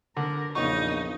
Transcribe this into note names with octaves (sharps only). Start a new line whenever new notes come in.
D3 A#4
A#1 E2 C#3 D#4 C#6